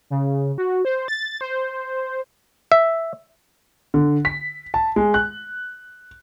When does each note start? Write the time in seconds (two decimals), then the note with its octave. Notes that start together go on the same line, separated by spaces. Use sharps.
0.10 C#3
0.58 F#4
0.85 C5
1.08 A6
1.41 C5
2.72 E5
3.94 D3
4.25 B6
4.74 A5
4.96 G#3
5.14 F#6